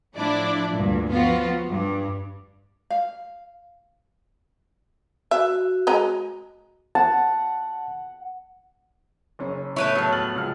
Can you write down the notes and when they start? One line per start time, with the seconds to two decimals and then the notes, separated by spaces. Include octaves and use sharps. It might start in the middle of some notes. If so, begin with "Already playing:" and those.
0.14 A2 F3 D4 E4 D5
0.72 D2 G2 A#2
1.10 F3 B3 F4 F#4
1.66 G2
2.91 F5
5.31 F#4 E5
5.87 G#3 D#5 A#5
6.95 F#5 A5
9.39 F#1 C#4
9.76 A2 B3 E4 C#5
9.95 F3 F#3
10.12 F6 A6 F#7
10.36 C#2 F6